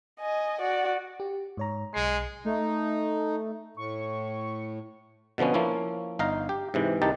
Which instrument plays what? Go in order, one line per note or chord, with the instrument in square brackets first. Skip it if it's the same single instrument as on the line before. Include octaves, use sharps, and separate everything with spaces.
[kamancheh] D#5 G#5
F#4 D5
[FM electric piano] G4
G#2 C#5 A#5
[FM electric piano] B1 C7 [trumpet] G#3
[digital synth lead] A3 [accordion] D#4
[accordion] A2 [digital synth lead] C#6
[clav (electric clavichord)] B2 D3 F3 B3 C#4
F3 A#3 C#4 E4
G1 D#4 F5 A#5
G4
G#2 C3 E3
C2 D#3 D#4 G4 A5